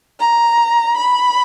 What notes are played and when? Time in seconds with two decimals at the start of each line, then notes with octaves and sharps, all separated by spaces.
0.20 A#5
0.96 B5